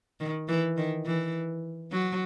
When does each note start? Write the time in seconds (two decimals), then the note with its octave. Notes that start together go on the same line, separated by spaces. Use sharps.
0.20 D#3
0.49 E3
0.77 D#3
1.06 E3
1.92 F#3